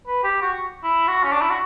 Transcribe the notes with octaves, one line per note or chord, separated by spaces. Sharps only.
B4
G4
F#4
E4
F#4
C#4
D4
E4
F#4